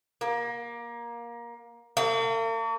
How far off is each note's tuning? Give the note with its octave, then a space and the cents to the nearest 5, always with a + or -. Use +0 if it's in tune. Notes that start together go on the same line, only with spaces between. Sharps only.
A#3 +20
A#3 -45